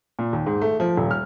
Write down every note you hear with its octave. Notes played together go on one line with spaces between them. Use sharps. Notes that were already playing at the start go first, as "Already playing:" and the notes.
A#2
D#2
G#2
A3
F3
D#1
F6